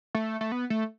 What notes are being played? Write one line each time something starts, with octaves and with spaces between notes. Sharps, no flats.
A3
A3
B3
A3